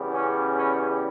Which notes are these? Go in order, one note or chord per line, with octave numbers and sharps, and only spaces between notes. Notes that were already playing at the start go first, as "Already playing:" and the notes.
Already playing: E2 C#3 G3
C#4
C#4